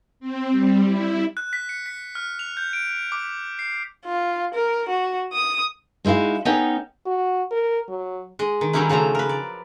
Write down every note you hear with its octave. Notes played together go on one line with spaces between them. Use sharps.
C4
G3
E4
F#6
B6
C#7
B6
F6
F7
G6
D7
D6
C7
F4
A#4
F#4
D#6
G#3 D#4 E4 F#4 F5
B3 C#4 D#4 A4 F#5 G5
F#4
A#4
F#3
G#3 D#5
D#3
D#3 F#3 G3 C#4 D#4 E4
C#3 F3 F#3 A3 A#5
A#4 B4
D5